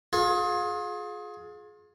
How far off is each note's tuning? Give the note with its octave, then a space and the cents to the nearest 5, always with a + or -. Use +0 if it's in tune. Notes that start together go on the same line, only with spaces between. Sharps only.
F4 +35 G#4 +20